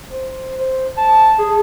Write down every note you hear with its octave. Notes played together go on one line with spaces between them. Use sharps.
C5
C5
A5
G#4